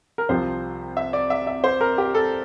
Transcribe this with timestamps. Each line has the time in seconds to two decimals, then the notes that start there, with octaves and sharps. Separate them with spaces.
0.18 A#4
0.29 C2 C3 F3 C5
0.97 E5
1.13 D5
1.30 E5
1.47 E5
1.64 C5
1.81 A#4
1.98 G4
2.14 A4